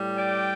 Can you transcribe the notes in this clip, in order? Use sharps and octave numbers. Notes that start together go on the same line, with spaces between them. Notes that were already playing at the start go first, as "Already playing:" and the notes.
Already playing: A2 G3
D5 G5